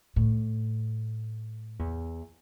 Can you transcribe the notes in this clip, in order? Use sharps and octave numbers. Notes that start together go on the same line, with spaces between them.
A2
E2